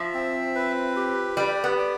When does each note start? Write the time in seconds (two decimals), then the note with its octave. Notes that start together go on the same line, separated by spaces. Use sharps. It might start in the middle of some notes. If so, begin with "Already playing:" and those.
Already playing: F3 E5
0.14 C4
0.55 B4
0.96 G4
1.37 G3 D5
1.64 B3
1.78 D5